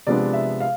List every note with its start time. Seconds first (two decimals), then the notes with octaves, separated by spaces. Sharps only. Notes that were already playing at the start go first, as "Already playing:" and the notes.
0.07 C3 F3 G#3 B3 D4 D5
0.33 E5
0.61 F5